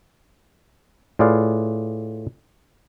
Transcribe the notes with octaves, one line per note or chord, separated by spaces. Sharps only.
A2 F4 G#4 B4 D5 F5